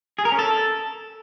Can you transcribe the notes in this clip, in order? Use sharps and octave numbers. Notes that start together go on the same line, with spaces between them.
G#4
A#4
C#4
A4